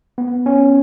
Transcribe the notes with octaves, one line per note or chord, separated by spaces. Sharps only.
B3
C#4